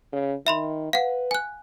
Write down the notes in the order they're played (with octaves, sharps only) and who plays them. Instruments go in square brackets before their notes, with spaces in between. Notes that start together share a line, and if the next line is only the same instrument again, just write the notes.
[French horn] C#3
[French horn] D#3 [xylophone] E5 B5 C6
[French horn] B4 [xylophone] F5 F#5
[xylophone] G#5 F#6